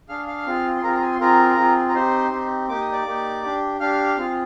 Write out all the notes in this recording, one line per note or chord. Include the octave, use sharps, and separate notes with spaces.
D4 G#4 F5 F6
F5 F6
C4 F4 G#4
C6
C4 F4 G#4 A#4 A#5
A#5
G#4 G#5
C6
C4 F4 G#4 A#4 A#5
C4 F4 G#4
A#5
C4 D#4 G4 C5 C6
C4 D#4 G4
A#3 D#4 G4 D6
D#6
D5 D6
A#3 D#4 G4
D4 G4
D4 G4 F5 F6
C4 F4 G#4